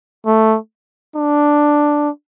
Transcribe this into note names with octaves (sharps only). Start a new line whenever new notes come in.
A3
D4